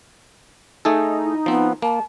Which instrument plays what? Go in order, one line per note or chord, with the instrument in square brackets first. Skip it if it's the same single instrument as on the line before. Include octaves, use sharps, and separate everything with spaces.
[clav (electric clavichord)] A3 G#4 A4 [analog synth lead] D#4
[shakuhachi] E4
[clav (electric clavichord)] F3 C4 [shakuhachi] B3
[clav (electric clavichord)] A#3 [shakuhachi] A5